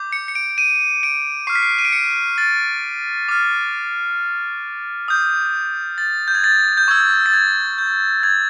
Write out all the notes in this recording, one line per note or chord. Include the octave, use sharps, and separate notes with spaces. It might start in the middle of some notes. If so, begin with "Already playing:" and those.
Already playing: D6 G6
C#7
C#7
D7
D#7
D7
C#6 F6 C7
B6
C7
D#7
D7
C#7
A6
D6 F6
D#6 G6
A6
G6
G#6
A6
G6
C#6 E6 G6 G#6
A6
G#6
G6
G#6